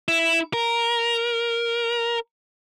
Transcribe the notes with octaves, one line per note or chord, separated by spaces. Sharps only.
E4
A#4